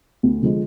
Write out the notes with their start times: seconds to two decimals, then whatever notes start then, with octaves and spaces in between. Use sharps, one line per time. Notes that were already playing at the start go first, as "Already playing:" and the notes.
0.23 D2
0.42 D3 F3 G#3